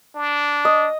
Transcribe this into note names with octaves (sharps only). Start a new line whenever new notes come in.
D4
D#5